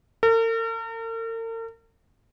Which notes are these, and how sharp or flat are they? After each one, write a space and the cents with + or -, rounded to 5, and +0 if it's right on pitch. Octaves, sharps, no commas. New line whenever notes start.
A#4 -45